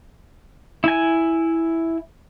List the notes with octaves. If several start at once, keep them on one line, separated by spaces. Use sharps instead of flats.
E4 G#5